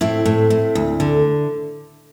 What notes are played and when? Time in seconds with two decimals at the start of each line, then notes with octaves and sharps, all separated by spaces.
0.01 A2 C4 E4
0.25 A2
0.50 A2
0.75 D2
1.00 D3